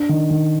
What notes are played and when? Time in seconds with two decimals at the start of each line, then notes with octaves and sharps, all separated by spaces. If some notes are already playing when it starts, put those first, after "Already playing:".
Already playing: D4
0.09 D#3
0.30 D#3